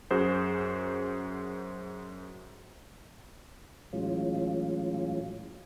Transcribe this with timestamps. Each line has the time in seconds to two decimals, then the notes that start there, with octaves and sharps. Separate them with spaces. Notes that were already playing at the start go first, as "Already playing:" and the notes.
0.11 F#2 F#4 G#4 C5
3.93 A2 E3 F#3 G#3 C#4 F4